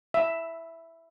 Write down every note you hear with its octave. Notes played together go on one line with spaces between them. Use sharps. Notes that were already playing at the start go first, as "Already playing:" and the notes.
E5